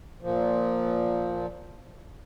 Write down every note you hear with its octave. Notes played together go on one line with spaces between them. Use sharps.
A#2 F3